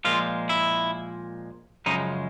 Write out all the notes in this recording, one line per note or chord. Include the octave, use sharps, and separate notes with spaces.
A#2 F3 G#3 F4
E4
F#2 C#3 F3 G#3 D#4